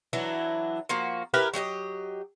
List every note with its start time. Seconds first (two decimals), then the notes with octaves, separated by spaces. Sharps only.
0.13 E3 F#3 D4 E4
0.89 F3 A#3 F#4
1.34 E4 G4 A#4 B4
1.54 F#3 G4 D5 D#5